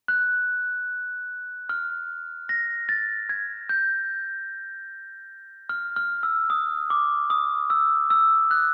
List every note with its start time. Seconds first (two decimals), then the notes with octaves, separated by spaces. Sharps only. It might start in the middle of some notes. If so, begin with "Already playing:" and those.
0.08 F#6
1.69 F6
2.49 A#6
2.89 A6
3.29 G#6
3.69 G6
5.69 F6
5.96 F6
6.23 E6
6.50 D#6
6.90 D6
7.30 D#6
7.70 E6
8.10 E6
8.51 F#6